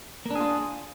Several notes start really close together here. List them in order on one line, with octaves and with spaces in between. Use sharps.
A#3 D4 G#4 F4